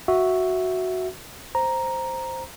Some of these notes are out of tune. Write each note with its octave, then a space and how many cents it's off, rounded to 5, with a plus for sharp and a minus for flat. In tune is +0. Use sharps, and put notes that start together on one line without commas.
F#4 +0 E5 +0
C5 +0 A#5 +0